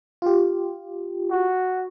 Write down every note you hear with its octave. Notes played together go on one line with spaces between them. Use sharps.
F4 G4
F#4